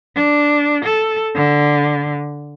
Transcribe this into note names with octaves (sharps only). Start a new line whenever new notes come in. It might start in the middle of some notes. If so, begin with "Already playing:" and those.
D4
A4
D3